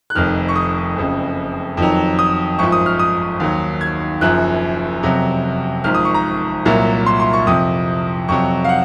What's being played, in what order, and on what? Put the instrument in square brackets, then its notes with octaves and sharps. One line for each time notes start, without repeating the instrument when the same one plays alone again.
[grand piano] F#6
F1 F2 D#3 F6
C#6
D#6
F#1 F2 C#3
F2 D#3 F#3
D#6
G#1 F#2 F3 C#6
D#6
F6
D#6
D#2 D#3 F#3
G#6
F#1 F#2 F3 F#6
F2 C3 F#3
G#1 G#2 F3 F6
D#6
C#6
A#5
C2 A#2 F#3
C6
C6
C#6
F2 C3 F3 D#6
F2 C3 F#3 C#6
F5
F#5